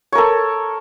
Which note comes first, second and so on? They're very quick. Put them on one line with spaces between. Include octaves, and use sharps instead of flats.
C#5 A#4 A4